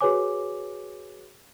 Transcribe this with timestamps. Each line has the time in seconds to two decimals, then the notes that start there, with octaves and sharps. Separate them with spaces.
0.01 F#4 G#4 B4 C#5 G#5 D6